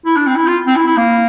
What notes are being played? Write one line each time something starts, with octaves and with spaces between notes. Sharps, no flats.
E4
D4
C4
E4
F4
C4
E4
E4
A#3